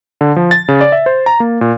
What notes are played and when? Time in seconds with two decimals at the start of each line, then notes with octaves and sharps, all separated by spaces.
0.21 D3
0.36 F3
0.51 A6
0.68 C#3
0.81 D5
0.92 E5
1.06 C5
1.26 A#5
1.40 A#3
1.61 A#2